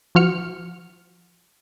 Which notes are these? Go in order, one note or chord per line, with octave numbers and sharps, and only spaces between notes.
F3 F#4 F6 C#7